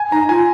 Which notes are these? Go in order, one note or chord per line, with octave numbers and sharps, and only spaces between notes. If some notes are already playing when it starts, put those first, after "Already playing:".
Already playing: G#5
D#4 A#5
F4 G#5